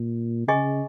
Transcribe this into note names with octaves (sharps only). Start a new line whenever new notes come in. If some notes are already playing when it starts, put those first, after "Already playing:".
Already playing: A#2
C#3 G#4 D#5 G#5 C#6